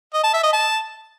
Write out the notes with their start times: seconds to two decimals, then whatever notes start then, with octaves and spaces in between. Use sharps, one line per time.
0.14 D#5
0.24 A5
0.33 E5
0.43 D#5
0.53 A5